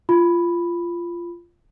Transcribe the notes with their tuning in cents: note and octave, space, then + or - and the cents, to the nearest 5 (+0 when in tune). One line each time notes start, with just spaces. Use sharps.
F4 -15 B5 +0